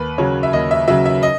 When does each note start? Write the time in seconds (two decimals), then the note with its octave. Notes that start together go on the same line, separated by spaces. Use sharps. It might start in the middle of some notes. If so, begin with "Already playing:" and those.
Already playing: D#2 B4
0.18 C#3 F#3 C#5
0.43 E5
0.53 D#2 D#5
0.71 E5
0.88 C#3 F#3 E5
1.06 E5
1.23 D#5